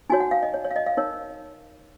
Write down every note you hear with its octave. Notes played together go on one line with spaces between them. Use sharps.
D#4 F#4 C#5 G#5
F#5
F5
D#5
C#5
C#5
F5
D#5
F5
D#4 A#4 C#5